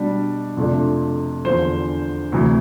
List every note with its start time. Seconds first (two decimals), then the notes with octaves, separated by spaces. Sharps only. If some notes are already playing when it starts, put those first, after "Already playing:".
Already playing: B2 G3 D4
0.57 F2 C3 F3 A3 D4
1.45 E2 D3 F3 C5
2.32 D2 C3 E3